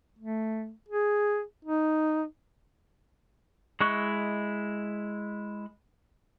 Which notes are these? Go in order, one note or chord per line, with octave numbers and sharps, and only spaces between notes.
A3
G#4
D#4
G#3 E4 D#5 C#6 F#6